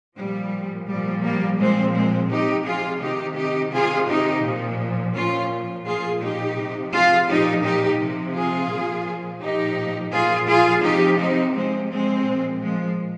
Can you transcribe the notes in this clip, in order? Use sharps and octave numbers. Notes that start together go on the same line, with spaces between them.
A#2 F3 G3
A#2 F3 G3
G3 A#3
A#2 F3 G#3 C4
G#3 C4
C3 F3 D#4 G4
F4 G#4
C3 D#3 D#4 G4
D#4 G4
C3 D#3 F4 G#4
D#4 G4
A#2 F3
A#2 F3 C#4 F4
A#2 F3 F4 G#4
D#4 G4
C3 F3
F4 G#4
A#2 F3 D#4 G4
D#4 G4
C3 F3
F4 G#4
A#2 F3
A#2 F3 D#4 G4
A#2 F3 F4 G#4
F4 G#4
C3 F3 D#4 G4
C4 D#4
C3 F3 G#3 C4
G#3 C4
A#2 F3
F3 G#3